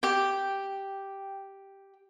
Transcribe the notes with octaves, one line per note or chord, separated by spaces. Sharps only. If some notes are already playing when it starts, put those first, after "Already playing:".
G4 G5